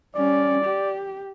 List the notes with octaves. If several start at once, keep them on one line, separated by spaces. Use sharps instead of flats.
G3 C#4 D5
G4